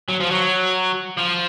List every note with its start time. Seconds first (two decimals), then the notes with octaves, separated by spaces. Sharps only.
0.09 F#3
0.20 F3
0.31 F#3
1.17 F3